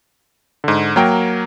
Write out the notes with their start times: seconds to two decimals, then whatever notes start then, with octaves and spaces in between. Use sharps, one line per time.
0.64 G#2 D3
0.96 F#3 A#3 A#4 G5